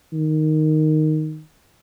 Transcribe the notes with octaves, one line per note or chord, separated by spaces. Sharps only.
D#3